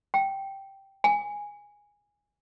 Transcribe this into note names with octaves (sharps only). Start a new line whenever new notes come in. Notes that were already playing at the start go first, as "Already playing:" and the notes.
G5
G#5